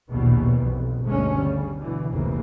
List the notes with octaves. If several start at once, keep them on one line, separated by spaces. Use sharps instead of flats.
A#1 D#2 B2 E3 G3 B3
B1 F2
G1 D2 G2 G#3 A3 C#4
C#3 G3
B2 D3 E3
F1 C#2 C#3 E3 A#3